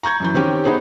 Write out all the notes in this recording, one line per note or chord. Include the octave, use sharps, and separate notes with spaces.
A#5 C#6 G6 G#6
F#2 E3 G6
D#3 C4 C#4 G4
B3 D#4 G#4 C5